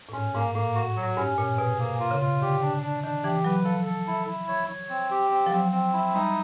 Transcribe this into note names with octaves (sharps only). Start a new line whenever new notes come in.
A2
G#2 C#4
G#2 A#3
A2 A#3
F#4
F#3
G2 C#4
A#2 C#4
B2 G#4
C3 A#3
F4
C#3
F4
D3 G4
D4
D4
D#3 D4
E3 G4
F#3 B4
F3 A4
A4
E4
E4
C#5
C#5
C4
G4
C4
F3
F#3 C4
C4
E4
G3 D#4